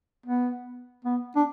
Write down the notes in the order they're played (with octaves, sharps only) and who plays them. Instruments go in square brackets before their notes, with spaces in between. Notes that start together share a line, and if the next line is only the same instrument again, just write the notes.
[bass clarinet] B3
B3
D4